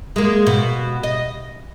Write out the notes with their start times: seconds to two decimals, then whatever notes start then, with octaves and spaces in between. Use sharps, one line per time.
0.16 G#3 A#3
0.47 B2
1.03 D#5